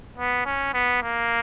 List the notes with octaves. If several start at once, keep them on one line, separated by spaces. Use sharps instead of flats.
B3
C#4
B3
A#3